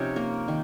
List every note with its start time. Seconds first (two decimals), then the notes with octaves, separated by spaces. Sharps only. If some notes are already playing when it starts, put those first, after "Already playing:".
Already playing: C3 F3 C#4 D#4 C#5
0.16 A#3 A#4
0.48 D#3